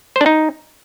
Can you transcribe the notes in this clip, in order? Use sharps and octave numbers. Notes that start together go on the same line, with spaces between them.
C5
D4
D#4